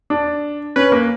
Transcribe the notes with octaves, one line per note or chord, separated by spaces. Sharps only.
D4
C#4 B4
A#3